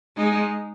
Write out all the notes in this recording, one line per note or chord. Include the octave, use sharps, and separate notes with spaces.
G#3 D#4